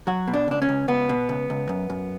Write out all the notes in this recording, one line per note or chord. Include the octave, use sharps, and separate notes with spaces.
F#3 F#4
B2
D4
C#2 D4
C#4
C#2
C#2 B3
B2
C#2
C#2
F#2
F#2